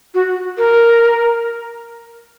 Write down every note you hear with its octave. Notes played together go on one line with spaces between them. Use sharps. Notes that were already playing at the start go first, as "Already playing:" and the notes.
F#4
A#4